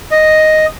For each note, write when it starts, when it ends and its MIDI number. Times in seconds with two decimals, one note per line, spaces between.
0.11 0.66 75